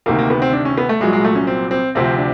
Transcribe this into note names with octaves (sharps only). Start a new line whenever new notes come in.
D2 C3 D#3 A#3
A#3
B3
C4
D4
C#4
B3
A3
C2 A#2 F#3 G#3
G#3
A3
C#4
C4
C4
D2 C3 F3 C4
D4